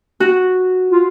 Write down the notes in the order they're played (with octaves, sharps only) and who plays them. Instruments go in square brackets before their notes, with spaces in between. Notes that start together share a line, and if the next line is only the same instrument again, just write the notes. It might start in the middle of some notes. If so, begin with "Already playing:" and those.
[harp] F#4
[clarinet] F4